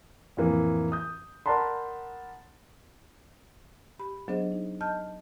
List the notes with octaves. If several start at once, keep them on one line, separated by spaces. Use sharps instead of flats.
F2 A2 E3 A#3
D#6 G6
A#4 D5 F#5 A5 B5 C6
G4 B5
F#3 B3 D4 G#4 C5 D#5
D#4
D#5 A5 F6 G6